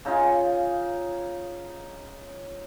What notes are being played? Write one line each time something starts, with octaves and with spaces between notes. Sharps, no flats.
C#3 D#4 F4 G#4